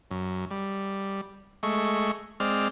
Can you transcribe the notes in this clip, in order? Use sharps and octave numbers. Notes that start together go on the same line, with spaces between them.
F#2
G3
G#3 A3 C#6
G#3 C4 D5 F6